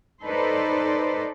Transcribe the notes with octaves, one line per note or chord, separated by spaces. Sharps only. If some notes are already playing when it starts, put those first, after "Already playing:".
D#4 A4 B4 C5 D5